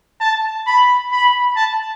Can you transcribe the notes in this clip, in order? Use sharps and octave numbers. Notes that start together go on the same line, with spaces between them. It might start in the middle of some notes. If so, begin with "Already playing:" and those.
A5
B5
B5
A5